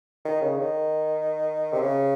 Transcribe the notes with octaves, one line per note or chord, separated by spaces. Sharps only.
D#3
C#3
D#3
C3
C#3